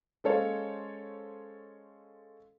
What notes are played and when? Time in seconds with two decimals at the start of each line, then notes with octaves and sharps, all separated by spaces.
0.24 G#3 C#4 A4 C5 C#5 F5